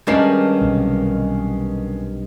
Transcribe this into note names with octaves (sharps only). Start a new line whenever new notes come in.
G2 D#3 G#3 C#4 D4 C7
B1 C3